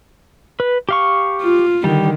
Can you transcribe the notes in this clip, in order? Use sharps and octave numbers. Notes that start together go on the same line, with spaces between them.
B4
G4 F5 C#6
F4
D3 D#3 G3 G4